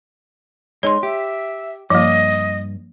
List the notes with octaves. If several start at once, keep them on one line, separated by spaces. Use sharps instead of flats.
G#3 D#4 C#5 C6
G4 E5
G2 F3 A#3 D#5